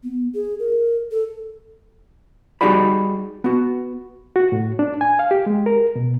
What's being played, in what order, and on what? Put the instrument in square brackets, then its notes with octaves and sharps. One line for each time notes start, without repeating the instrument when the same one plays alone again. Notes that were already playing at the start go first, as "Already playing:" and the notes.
[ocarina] B3
G#4
A#4
A4
[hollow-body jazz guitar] G3 D#4 F#4 G#4 D5 B5
B3 F#4
[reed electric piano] F#4
A2
D4
G#5
F5
G4
G#3
A#4
B2